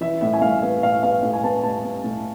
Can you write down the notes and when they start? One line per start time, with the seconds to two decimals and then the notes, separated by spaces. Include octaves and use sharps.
0.01 E3 E5
0.21 A2 E5
0.34 G#5
0.42 A2 F5
0.63 B3
0.83 A2 F5
1.03 B3 F5
1.23 A2
1.33 G#5
1.44 B3 A5
1.63 A2 A5
1.84 B3
2.04 A2